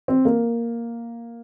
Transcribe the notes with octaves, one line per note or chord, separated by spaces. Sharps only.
C4
A#3